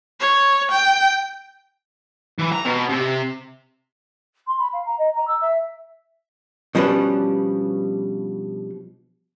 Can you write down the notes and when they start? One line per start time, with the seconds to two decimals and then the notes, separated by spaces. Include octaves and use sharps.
0.20 C#5
0.71 G5
2.39 E3
2.52 A#5
2.65 B2
2.89 C3
4.47 C6
4.59 B5
4.73 F5
4.86 A#5
4.98 D#5
5.15 A#5
5.27 E6
5.41 E5
6.75 B2 F3 G3 C#4 D4 B4